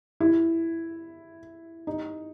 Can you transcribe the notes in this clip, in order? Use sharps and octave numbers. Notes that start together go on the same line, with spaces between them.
E4
D#4